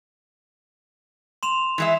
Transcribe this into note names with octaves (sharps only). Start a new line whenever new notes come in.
C6 E7 F7
E3 G#3 E5